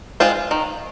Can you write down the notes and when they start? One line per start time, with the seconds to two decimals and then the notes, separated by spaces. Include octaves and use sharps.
0.20 G#3 C4 F4 C5
0.51 D#3